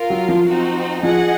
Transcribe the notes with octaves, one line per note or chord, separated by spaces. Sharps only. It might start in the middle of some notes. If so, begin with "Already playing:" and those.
Already playing: F4 A#4 F5
F#3
F3
C4 D#4 F#4
F3 G#4 D#5 F#5